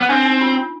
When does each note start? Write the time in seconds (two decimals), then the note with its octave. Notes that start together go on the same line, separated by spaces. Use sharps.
0.01 B3
0.09 C4 D4
0.25 D#4
0.41 F4
0.58 F4